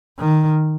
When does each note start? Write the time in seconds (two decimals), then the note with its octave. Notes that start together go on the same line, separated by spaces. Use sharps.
0.19 D#3